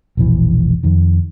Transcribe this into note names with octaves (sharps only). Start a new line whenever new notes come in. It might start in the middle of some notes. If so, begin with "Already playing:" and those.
E1 A#1 E3
F2 D#3